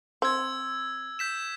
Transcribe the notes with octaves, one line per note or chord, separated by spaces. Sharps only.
C4 E6 G#6
G6 B6 E7